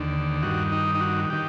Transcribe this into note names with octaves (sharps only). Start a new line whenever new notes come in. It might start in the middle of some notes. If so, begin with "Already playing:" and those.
Already playing: D#2 D3
G2 D#3 F#4
D#4
D#4
F#4
D#3 G4